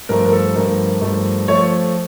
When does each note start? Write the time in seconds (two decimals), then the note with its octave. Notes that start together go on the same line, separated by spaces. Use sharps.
0.09 G2 F3 A3 A#4
0.25 A#4
0.32 A4
0.55 G2 F3 A3 A#4
1.01 G2 F3 A3
1.48 F3 A3 C#5